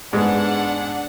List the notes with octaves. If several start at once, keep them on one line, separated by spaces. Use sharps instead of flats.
G#2 G#3 B3 D4 F#5